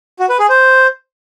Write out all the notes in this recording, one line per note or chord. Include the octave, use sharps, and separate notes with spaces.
F#4
B4
G#4
C5